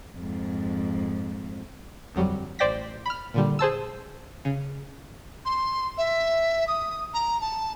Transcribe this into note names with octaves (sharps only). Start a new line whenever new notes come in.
F2 G#2
G1 F2 F#3 G3
A1 C5 D5 G5 A#6 B6
B5 F6
A#2 D3 G3
G#4 C5 A5 E6
C#3
C6
E5
D#6
A#5
A5